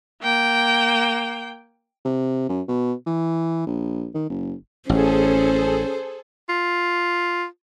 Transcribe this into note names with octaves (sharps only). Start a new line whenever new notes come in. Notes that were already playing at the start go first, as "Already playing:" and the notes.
A#3 G5
C3
F#2
B2
E3
A#1
D#3
F#1
A1 C#4 G#4 A4 C5
F4